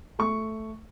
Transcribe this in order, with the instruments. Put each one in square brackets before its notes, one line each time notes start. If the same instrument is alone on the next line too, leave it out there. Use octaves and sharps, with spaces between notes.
[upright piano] A3 C#6